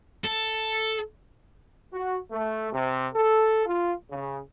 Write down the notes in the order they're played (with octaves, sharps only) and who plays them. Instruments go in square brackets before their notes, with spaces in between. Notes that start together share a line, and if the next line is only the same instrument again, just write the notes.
[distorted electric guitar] A4
[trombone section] F#4
A3
C3
A4
F4
C#3